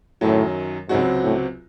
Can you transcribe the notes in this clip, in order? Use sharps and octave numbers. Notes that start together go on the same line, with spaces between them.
F#2 A2 D#3 F#3
C#2 G#2 C3 F#3 C4 F#4
A2